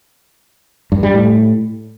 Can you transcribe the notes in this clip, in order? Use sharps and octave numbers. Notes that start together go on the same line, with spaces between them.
G2
G3
A2